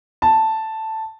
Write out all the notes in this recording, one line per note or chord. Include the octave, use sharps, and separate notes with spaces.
A5